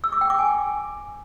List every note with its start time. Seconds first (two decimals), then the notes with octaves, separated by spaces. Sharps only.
0.04 E6
0.12 D6
0.21 G5
0.30 D6
0.39 G#5